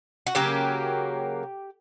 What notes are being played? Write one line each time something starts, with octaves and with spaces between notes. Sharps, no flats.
F#4
C#3 F#3 A#3 G4